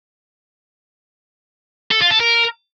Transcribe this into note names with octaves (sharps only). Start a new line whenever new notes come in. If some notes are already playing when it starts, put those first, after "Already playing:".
A4
F4
A4
A#4